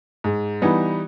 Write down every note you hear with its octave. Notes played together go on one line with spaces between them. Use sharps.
G#2
E3 G3 B3 D#4